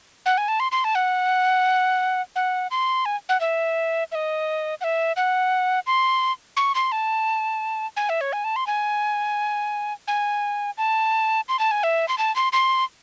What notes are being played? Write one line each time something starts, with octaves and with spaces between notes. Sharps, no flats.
F#5
G#5
A5
C6
C6
A5
F#5
F#5
C6
G#5
F#5
E5
E5
D#5
F#5
E5
F#5
C6
C#6
C6
A5
G#5
E5
C#5
G#5
A5
C6
G#5
G#5
A5
C6
A5
G#5
E5
C6
A5
C6
C6